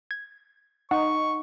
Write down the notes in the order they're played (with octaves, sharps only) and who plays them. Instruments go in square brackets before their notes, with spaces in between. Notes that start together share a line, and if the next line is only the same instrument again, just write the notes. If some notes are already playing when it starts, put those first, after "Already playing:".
[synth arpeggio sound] G#6
[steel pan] D#4 [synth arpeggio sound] F#5 [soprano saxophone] C#6